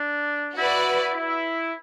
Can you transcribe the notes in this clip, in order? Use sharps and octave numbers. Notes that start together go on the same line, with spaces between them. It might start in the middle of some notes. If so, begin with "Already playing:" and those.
Already playing: D4
E4 F#4 B4 D5
E4